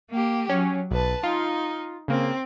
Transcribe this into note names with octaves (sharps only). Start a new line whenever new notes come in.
A#3 G4
F#3 C#4
B1 B4 A5
D#4 F4
C#3 A#3 C4